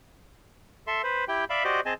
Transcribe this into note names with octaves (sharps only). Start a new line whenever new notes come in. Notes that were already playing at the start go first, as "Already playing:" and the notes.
A4 E5 C6
B4 C5
E4 G4 G5
D5 E5 F5 B5
F#4 G4 C5 D5 D#5
C4 G#4 D#5 G#5 A5